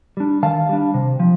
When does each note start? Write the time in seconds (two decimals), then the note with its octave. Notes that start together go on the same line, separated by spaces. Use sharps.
0.17 G3 D4
0.43 D#3 F5 A5
0.69 G3 D4
0.94 C3
1.20 F3